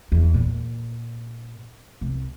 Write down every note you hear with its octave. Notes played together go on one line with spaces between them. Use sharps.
E2
A#2
C2